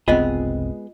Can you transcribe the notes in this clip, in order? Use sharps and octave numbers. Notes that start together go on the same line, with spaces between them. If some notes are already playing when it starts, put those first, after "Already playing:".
F#1 C2 G#3 B3 C4 F4 G#4 D#5